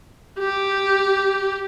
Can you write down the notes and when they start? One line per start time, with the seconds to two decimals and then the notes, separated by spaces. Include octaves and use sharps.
0.39 G4